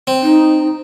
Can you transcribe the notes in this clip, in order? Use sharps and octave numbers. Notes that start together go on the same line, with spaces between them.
C4
D#4